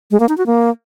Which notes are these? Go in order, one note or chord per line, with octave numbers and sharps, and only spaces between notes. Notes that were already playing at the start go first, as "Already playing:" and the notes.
G#3
A#3
D#4
F#4
A#3